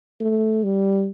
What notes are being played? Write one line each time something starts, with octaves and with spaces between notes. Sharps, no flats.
A3
G3